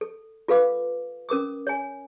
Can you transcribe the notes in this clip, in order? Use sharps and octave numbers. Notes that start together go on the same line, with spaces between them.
A4
F4 A4 B4 F5 D6
C#4 A#4 D6 D#6
C#5 G#5